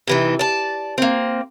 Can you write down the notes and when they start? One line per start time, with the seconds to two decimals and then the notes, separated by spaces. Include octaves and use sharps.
0.07 C3 E3 D#4
0.39 D5 A5
0.98 A#3 C4